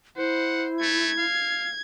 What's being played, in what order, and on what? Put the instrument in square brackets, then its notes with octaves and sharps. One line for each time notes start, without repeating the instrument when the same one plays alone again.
[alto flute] E4 [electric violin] C5 [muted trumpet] F#5
[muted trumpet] A3 [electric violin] G#6
[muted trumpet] F5